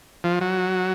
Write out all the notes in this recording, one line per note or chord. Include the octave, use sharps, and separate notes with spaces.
F3
F#3